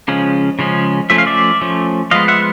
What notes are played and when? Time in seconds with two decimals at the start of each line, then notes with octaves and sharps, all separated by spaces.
0.08 C#3 F3 G#3 C#4
0.59 C#3 F3 G#3 C#4
1.10 F3 A3 C#4 E5
1.18 F5
1.27 D5 E5
1.61 F3 A3 C#4
2.11 F3 G#3 B3 D#5 F5
2.28 E5 F#5